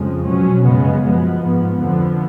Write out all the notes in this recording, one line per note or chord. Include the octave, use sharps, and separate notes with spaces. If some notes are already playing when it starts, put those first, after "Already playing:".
Already playing: F2 C#3 F3 G#3
B2 F#3 C#4
F#2 C#3 G#3 B3
F#2 F3 G#3 B3
G#2 F3 B3
F2 D3 F3 B3